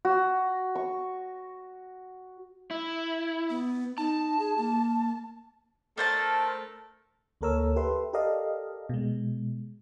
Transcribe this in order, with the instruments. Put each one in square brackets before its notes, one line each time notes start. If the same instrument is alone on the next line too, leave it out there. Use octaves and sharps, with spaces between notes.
[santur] F#4
C#6
[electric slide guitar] E4
[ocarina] B3
[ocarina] D#4 [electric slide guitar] A5
[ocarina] G#4
A#3
[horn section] A3 A4 A#4 [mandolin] D4 C5 A5
[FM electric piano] D2 A#3 A4 A#4 C#5 E6
G4 A4 B4 E5 C6
G4 A4 A#4 D5 D#5 F5
B2 G#3